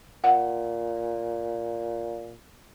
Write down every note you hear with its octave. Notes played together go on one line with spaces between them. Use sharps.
A#2 F#5